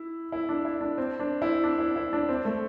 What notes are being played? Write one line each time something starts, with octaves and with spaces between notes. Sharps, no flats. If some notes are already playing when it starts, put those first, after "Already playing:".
Already playing: E4
E4
D4
E4
D4
C4
D4
E4
D4
E4
E4
D4
C4
A3